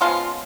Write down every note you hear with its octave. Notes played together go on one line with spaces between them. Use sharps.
C#3 F3 G#3 B3 F4